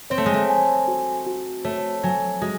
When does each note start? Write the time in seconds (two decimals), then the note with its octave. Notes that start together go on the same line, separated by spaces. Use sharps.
0.10 C4 C#5
0.18 A3
0.26 G#3
0.34 A3
0.49 G#5
0.88 F#4
1.26 F#4
1.65 A3 C#5
2.03 F#3 G#5
2.42 G#3 F#4